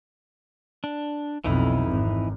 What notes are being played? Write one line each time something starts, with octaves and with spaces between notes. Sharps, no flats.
D4
B1 F2 E3 D#4 E4
G#1